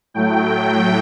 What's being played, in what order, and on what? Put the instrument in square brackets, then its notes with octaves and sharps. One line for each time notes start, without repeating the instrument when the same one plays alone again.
[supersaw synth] A2 F#3 A3 G5